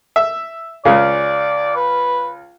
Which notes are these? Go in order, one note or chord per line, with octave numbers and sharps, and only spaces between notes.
E5
C#2 C#3 D5
B4